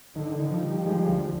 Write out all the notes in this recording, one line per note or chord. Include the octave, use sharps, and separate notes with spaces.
D3 D#3
D#3
F3
G3
F3 G#3
D2